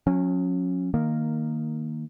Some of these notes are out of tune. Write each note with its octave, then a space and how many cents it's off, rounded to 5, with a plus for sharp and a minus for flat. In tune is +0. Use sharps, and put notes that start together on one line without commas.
F#3 -45 C#4 -15
D#3 -5 A#3 -10